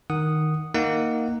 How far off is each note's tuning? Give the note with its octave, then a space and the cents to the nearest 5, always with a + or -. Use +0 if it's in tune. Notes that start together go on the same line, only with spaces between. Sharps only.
D#3 +0 F#5 +0 D#6 -5
A#3 +0 D#4 +5 F#5 +10